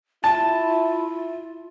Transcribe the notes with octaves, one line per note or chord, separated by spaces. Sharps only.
E4 F4 A5